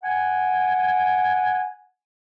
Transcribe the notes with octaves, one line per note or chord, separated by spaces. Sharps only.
F#5 G#5